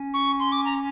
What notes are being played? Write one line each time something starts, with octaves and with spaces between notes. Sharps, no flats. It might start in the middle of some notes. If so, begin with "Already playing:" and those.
Already playing: C#4
C#6
C6
D6
A#5